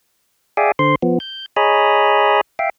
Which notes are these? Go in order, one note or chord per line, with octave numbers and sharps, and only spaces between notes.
G#4 D5 E5 F5 G5 G#5
D3 C5 C6
F3 B3
G6
G#4 C#5 D#5 G#5 A#5 B5
E5 F5 G5